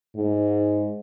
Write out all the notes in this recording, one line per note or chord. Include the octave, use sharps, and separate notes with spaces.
G#2